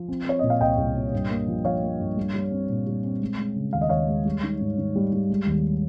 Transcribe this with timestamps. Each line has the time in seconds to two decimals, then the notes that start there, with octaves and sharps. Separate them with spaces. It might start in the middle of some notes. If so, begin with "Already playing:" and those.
Already playing: F3
0.09 C4
0.26 C4 C#5
0.39 A#2 D#5
0.50 F5
0.60 C2 D#5 G5
0.78 C2
0.95 A#2
1.12 G2
1.30 A#3
1.48 F3
1.65 F3 C#5 F5
1.82 A#3
2.00 G2
2.17 G3
2.34 G3
2.52 C4
2.69 A#2
2.87 G3
3.04 C4
3.21 G#3
3.38 G#3
3.56 C#3
3.73 D#2 F5
3.81 D#5
3.89 D#2 C#5 F5
4.08 G#3
4.25 G3
4.43 D#3
4.61 G#2
4.78 D#3
4.95 G3
5.13 G3
5.30 G#3
5.46 D#2